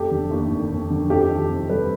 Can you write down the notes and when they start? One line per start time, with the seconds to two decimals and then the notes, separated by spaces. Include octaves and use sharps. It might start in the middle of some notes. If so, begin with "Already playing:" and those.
Already playing: F1 G4 A4
0.11 D3
0.31 D#2
0.51 F1
0.70 F1
0.90 D3
1.10 F2 G4 A4
1.30 D#3
1.50 C3
1.69 G3 A4 B4